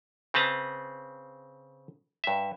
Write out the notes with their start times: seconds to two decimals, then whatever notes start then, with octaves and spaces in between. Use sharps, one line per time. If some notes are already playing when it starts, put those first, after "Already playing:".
0.34 C#3 C4 B4 A5 A#5
2.24 G2 E5